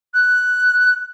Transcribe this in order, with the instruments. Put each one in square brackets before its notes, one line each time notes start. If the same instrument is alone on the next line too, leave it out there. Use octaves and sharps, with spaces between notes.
[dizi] F#6